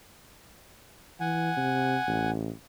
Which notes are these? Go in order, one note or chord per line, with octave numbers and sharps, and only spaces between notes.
E3 F#5 G#5
C3
A1